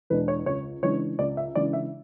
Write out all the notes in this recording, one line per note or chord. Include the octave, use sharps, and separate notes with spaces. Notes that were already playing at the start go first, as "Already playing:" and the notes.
E2 B2 G#3 D4 B4
C#5
C#2 C#5
C#3 E3 G#3 D4 C#5
C#2 D5
E5
C#3 E3 G#3 D4 D5
E5